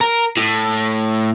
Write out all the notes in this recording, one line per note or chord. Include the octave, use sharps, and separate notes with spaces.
A#4
A2